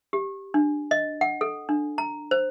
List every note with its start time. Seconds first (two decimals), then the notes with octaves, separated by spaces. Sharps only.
0.13 G4
0.54 D4
0.91 D#5
1.21 F#5
1.41 A4
1.69 D4
1.98 A#5
2.31 C5